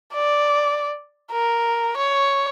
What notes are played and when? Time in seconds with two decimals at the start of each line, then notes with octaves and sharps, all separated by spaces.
0.14 D5
1.32 A#4
1.97 C#5